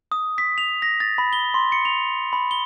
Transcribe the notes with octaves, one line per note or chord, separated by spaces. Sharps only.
D#6
B6
F7
A#6
A6
B5
G7
C6
C#7
F7
B5
G7